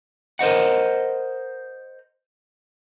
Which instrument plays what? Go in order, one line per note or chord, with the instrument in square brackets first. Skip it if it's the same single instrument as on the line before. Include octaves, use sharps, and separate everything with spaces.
[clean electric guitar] A#4 C5 D#5 F#5